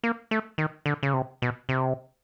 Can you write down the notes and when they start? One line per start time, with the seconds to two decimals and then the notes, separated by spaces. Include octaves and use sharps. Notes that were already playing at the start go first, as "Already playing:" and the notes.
0.03 A#3
0.31 A3
0.58 D#3
0.86 D3
1.03 C#3
1.14 C3
1.42 B2
1.69 C3